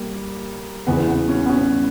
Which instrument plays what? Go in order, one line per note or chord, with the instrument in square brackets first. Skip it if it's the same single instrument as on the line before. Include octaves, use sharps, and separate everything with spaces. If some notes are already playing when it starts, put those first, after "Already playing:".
Already playing: [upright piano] G3 A#3
[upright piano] E2 C#3 E3 [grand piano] B3
[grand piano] B3
C#4
B3
C#4